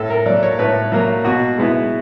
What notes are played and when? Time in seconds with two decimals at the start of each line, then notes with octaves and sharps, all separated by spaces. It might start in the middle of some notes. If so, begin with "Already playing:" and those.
Already playing: A2 A4
0.10 A#4
0.26 F#3 A#3 D5
0.43 C#5
0.59 A2 B4
0.92 F#3 A#3
1.25 B2 F#4
1.58 G#3 B3 E4